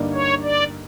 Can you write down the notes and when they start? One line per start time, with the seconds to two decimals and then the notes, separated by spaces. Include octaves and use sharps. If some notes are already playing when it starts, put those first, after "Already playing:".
Already playing: G2 D3 G3 A#3 D#4
0.13 C#5
0.43 D5